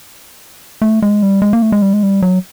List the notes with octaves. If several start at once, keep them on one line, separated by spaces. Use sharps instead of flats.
A3
G#3
G3
G#3
A#3
A3
G#3
G3
G#3
G3
F#3